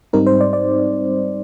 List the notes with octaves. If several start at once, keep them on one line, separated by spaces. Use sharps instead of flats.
G#2 G3 C4 D#4 A#4
C5
D5
D5